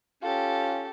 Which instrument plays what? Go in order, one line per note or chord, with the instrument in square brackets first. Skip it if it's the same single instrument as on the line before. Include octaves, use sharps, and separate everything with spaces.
[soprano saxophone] C#4 [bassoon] F4 [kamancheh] G4 A4